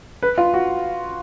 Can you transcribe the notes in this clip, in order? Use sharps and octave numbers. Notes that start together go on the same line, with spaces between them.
B4
F4
F#4